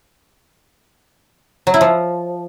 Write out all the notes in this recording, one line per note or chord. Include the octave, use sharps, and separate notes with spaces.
F#3
E4
F3